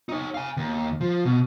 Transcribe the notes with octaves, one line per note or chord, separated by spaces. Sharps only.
D#4 C#5
F5 G#5
D#2
F3
B2